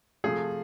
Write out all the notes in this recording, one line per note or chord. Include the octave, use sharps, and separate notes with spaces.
C3 F3 A3 G#4